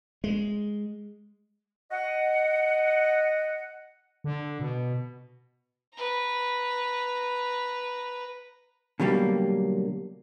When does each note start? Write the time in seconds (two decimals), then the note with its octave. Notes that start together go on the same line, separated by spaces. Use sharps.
0.24 G#3
1.91 D#5 F#5
4.24 D3
4.60 B2
5.94 B4 A#5
9.00 B2 D3 F#3 G3 A#3